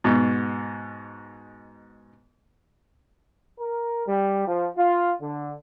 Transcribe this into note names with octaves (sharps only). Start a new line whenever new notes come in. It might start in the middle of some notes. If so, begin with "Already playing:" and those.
G#2 B2
A#4
G3
F3
F4
D3